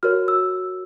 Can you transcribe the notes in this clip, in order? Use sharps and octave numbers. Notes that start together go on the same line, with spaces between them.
F#4 A#4 C#5 F6
E6